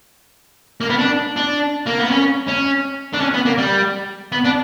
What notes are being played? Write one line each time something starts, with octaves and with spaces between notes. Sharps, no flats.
A#3
B3
D4
D4
A#3
B3
C#4
C#4
D4
C#4
B3
A#3
G3
B3
D4